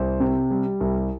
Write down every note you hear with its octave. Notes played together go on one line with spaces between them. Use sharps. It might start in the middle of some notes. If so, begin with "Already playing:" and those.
Already playing: C2 C5
C3
G3
C2